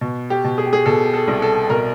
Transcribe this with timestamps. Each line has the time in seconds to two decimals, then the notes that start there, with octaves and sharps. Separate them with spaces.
0.01 B2
0.30 G4
0.44 B2
0.58 G#4
0.66 G4
0.73 G#4
0.86 B2 A4
1.14 A4
1.27 C2
1.42 A4
1.70 B2 A#4